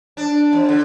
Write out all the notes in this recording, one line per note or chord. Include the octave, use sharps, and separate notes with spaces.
D4
F2
D3